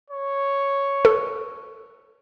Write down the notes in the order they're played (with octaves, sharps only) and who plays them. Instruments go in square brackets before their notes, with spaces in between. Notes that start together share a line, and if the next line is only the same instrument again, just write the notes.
[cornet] C#5
[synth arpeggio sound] A4